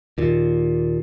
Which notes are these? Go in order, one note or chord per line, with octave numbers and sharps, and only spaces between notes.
D#2 A#2